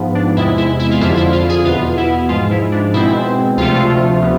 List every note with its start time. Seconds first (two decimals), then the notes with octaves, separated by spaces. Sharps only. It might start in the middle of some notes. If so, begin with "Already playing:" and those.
Already playing: G#2 F3 B3
0.15 D4
0.37 E2 C3 G#3 E4
0.58 E4
0.79 E4
0.91 F4
1.01 F2 D3 F3 E4
1.17 E4
1.33 F4
1.49 G#4
1.65 E2 B2 B3 F4
1.97 E4
2.29 G#2 F3 G#3 F4
2.51 E4
2.72 D4
2.94 B2 G#3 C4 E4
3.57 D2 C3 F3 A3 F4
4.22 F3 B3